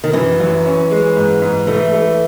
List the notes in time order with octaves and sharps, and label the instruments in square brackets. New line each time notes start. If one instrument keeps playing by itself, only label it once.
[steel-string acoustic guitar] D#3
[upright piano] F#2 [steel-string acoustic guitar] E3
[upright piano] F#3
C#4
G#3
G#2
G#2
[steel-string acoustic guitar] E3 [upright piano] A3
[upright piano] A3